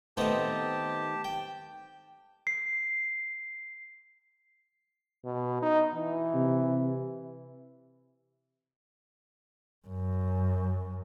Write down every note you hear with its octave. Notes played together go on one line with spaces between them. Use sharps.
D#3 A3 B3 C4 D#4 G4 A5
G5
C7
B2
D#4
E3
C3
F#2